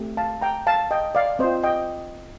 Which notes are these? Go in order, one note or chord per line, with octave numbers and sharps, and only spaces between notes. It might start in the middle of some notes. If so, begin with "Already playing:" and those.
Already playing: A3 C4 G4
F5 A5
G5 A#5
F5 A5
D#5 G5
D5 F5
C4 F4 C5 D#5
D#5 G5